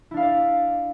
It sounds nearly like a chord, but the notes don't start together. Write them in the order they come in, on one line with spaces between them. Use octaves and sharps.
E4 D4 F5 E5 D5